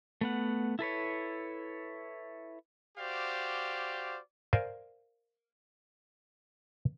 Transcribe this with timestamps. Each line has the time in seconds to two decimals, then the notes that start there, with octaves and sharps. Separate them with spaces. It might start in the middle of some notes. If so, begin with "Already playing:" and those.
0.21 A3 B3 F#5
0.79 E4 A4 B4 C#5
2.98 F#4 G4 C5 D5 F5
4.53 A#4 C5 D5 F5 G#5